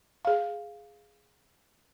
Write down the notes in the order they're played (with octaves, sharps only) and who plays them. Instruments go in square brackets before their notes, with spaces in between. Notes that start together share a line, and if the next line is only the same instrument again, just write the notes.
[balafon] G#4 F5